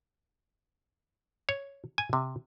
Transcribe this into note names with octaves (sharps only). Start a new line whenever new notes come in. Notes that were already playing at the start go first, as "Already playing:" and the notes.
C#5
G#5
C3